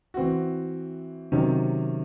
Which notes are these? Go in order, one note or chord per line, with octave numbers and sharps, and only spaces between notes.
E3 C4 F#4
C3 D#3 F#3 C#4